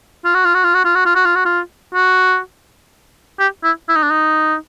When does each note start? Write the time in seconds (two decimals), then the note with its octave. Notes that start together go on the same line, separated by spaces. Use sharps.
0.25 F4
0.34 F#4
0.45 F4
0.54 F#4
0.64 F4
0.74 F#4
0.85 F4
0.95 F#4
1.06 F4
1.15 F#4
1.25 F4
1.35 F#4
1.45 F4
1.94 F#4
3.40 G4
3.64 E4
3.89 E4
3.96 D#4
4.03 D4
4.11 D#4